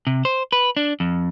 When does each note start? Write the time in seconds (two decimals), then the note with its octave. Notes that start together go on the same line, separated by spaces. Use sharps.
0.07 C3
0.25 C5
0.52 B4
0.77 D4
1.00 F2